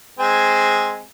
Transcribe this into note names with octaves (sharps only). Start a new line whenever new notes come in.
G#3 C4 G#5